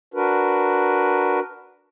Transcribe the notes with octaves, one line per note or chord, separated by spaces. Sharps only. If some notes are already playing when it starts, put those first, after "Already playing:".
D4 F#4 A#4 B4